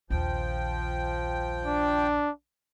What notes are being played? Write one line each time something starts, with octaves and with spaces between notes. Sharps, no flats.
A#1 D#2 F3 G5
D4